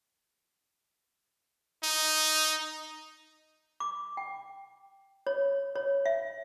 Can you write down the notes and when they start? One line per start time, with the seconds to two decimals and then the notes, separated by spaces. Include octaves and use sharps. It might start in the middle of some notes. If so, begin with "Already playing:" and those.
1.84 D#4
3.80 D6
4.17 G5
5.27 C#5
5.75 C#5
6.06 E5